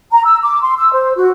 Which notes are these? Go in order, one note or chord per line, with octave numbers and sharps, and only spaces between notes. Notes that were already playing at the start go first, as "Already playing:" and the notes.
A#5
E6
D6
C6
E6
C5
F#4